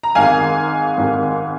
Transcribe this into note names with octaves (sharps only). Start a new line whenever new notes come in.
A#5
G#1 G#2 D#3 F5 G#5
G#1 G#2 D#3